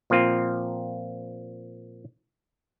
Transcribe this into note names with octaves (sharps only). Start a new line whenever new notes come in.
A#2 F3 A#3 C4 F4